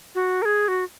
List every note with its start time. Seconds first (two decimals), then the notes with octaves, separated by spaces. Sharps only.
0.15 F#4
0.42 A#4
0.45 G#4
0.68 F#4